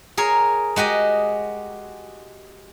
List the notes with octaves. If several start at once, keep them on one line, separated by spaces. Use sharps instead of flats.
G#4 A#4 C#5
G#3 F#4 G4 D#5